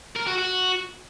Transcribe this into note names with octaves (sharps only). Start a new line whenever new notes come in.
A#4
F#4
F#4